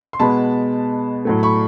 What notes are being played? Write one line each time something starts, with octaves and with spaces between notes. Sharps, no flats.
C6
B2 G#3 B3 A5 B5
A2 F#3 A3
B5 C#6